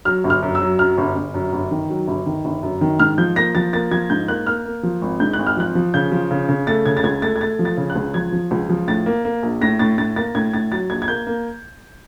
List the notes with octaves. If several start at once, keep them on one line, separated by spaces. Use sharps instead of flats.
F#3 F6
G1
F6
F#2
E6
F#3
F#2 F6
G1
G1
F#2
G1
D#3
F#3
G1
D#3
G1
F#2
D#3
G#2 F6
F3 G6
A#3 A#6
F3 A6
A#3 A6
F3 G#6
G#2 G6
A#3 F#6
A#3 F6
A#3
F3
G#1
G#2 G6
F#6
G#1
F6
F3 F#6
F3
C#3 G6
F3
C#3
C#3
A3 A6
C#3 G#6
A6
C#2 G#6
A3 A6
G#6
A3 A6
F3
A6
C#3
F#6
C#2
F3 G#6
F3
C#2
F3
A2 A6
A#3
A#3
A#1
A2 A#6
A2 A6
A2 A6
A#3 A6
A2 G#6
A2 A6
F#3 A6
A#1 G#6
G#6
A#3 G6
A#3